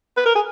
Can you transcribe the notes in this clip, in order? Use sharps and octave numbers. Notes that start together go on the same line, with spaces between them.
B4
A#4
G#4